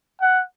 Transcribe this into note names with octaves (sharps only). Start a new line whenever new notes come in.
F#5